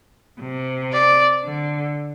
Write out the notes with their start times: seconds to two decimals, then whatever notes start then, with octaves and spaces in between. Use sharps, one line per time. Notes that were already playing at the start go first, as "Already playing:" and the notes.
0.41 C3
0.92 D5
1.44 D3